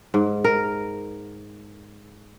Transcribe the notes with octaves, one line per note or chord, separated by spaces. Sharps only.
G#2
A#4